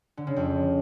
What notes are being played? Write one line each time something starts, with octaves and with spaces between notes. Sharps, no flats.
D3
C#3
F2